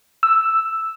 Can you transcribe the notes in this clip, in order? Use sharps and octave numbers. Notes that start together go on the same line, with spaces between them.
E6